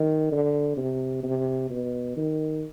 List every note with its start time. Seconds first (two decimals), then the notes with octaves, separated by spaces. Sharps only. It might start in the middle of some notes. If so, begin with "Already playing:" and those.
Already playing: D#3
0.32 D3
0.77 C3
1.23 C3
1.70 B2
2.16 D#3